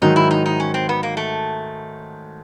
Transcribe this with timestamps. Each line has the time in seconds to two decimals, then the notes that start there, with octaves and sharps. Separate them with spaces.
0.02 G#2 D#3 F#3 D#4
0.16 E4
0.31 D#4
0.46 D#4
0.60 C#4
0.74 C4
0.89 B3
1.03 A#3
1.17 A3